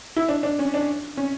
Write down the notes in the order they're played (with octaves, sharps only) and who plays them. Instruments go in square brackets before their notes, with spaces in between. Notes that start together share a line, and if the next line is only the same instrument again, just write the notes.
[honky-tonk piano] E4
D4
D4
C#4
D4
C#4